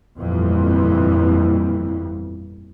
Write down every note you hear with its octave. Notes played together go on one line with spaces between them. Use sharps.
G1 F2 A#2 E3